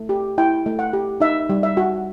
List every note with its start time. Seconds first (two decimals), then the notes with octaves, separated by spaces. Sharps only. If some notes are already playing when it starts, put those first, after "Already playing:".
Already playing: A3
0.09 G4
0.38 E4 G5
0.66 A3
0.79 F#5
0.93 G4
1.21 D#4 E5
1.49 G3
1.63 E5
1.77 F#4